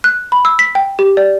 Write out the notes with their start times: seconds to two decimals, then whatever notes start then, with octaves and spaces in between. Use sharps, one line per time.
0.04 F#6
0.32 B5
0.45 E6
0.59 B6
0.75 G5
0.99 G4
1.17 D5